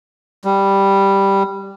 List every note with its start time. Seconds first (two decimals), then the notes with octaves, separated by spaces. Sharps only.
0.45 G3